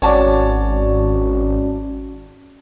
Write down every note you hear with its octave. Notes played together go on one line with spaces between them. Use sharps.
G#1 C#4 F#4 C#5 D5 A5